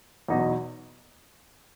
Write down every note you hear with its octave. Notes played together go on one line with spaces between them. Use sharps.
E2 B2 F#3 B3 D#4